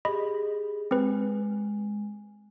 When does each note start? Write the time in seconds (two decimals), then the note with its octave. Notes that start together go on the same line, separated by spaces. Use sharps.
0.05 G4 G#4 D#5 B5
0.91 G#3 C4 B4